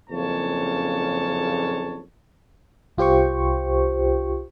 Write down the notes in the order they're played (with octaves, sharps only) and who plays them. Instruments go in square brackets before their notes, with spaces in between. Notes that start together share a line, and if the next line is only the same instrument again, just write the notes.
[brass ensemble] F#1 F2 A#2 C#3 C#5 A5
[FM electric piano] C2 F4 G4 C5 G5 C#6